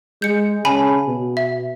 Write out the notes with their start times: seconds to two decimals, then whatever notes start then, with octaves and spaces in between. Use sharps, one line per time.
0.22 G#3 G6 C#7
0.65 C#3 G#5 A5 B5
1.07 B2
1.37 E5